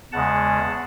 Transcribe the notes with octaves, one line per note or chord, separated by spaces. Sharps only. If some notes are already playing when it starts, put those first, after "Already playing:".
E2 C#3 G#3 F#5 A5